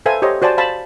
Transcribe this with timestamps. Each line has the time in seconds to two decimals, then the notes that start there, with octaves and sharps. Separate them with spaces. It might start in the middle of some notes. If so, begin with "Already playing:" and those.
0.06 A4 B4 C5 E5 F5 G#5
0.22 G4 C5 C#5 D#5
0.42 F#4 C5 D5 G#5 A5
0.58 C5 F5 A5 B5